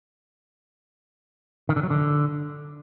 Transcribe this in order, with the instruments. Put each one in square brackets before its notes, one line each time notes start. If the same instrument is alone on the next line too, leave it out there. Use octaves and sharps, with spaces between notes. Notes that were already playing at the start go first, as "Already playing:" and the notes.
[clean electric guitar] D#3
D3
F#3
D3